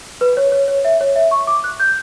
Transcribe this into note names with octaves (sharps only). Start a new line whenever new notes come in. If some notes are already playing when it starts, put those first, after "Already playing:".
B4
C#5
C#5
C#5
E5
C#5
E5
C#6
D6
F#6
G6